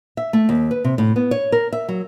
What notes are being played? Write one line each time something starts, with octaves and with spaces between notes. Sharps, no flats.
E5
A3
D#2
B4
C3
A2
B3
C#5
A#4
E5
F#3